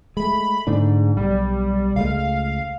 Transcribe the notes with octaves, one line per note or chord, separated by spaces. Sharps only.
G#3 A3 B5
G#2 D3 A3 D4
B1 G3
C#2 G#3 A3 F5